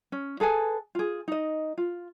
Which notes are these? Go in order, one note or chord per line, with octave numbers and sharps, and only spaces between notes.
C#4
G#4 A4 B4 G#5
F4 G#4
D#4 D#5
F4